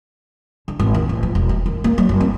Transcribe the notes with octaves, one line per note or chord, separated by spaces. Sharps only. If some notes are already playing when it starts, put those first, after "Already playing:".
D3
G#1
D#2
A1
F3
E1
E4
D#3
A#3
F#3
F#1
C4